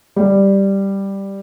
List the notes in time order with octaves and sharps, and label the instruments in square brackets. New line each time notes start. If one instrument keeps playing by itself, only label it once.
[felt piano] G3